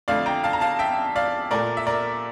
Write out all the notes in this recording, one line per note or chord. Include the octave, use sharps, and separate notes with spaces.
F2 D3 A3 D5 F5
G5 A#5
F5 A5
A#5
F5 A5
E5 G5
D5 F5
A#2 A3 A#4 D5
E5
A#4 D5